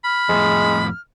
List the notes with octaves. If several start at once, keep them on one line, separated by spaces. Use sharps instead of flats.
B5 F6
F2 A2 G#3